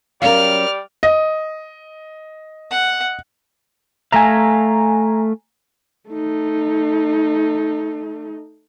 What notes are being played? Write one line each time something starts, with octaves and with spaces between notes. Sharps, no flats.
F#3 G3 C#4 A#4 D5 F5 F6
D#5
F#5
A3 E5 F5 G#5 A#5
A3 D#4